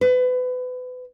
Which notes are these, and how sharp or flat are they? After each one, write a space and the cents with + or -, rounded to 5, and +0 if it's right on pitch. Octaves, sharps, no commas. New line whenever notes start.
B4 +30